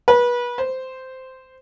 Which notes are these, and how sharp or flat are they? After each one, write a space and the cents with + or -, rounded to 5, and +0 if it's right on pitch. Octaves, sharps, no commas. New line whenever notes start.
B4 -30
C5 -10